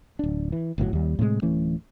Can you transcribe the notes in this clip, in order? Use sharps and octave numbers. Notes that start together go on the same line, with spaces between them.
D1 D4
E3
G1 A2 E3 F#3
D#2 G3
A2 C3 D#3 G#3
D1 E3 A3 C#4